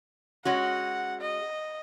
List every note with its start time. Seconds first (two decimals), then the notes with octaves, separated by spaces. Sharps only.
0.45 G#3 C#4 F#4 F#5
1.21 D#5